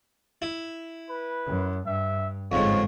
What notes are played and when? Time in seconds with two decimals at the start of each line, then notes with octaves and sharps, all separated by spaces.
0.42 E4
1.09 B4
1.47 F#2
1.86 G2 E5
2.52 G1 F2 G#2 C#5